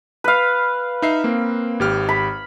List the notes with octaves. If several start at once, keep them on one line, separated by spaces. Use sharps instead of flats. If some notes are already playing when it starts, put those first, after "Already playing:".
B4 F5
D#4 E5 C7
A#3 C4
G#1 G4 F6
B5